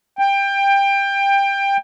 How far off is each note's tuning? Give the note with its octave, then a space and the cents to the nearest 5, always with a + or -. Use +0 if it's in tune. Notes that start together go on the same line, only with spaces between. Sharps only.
G5 +20